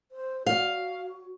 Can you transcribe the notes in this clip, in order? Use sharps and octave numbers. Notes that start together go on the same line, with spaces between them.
C5
F#4 F5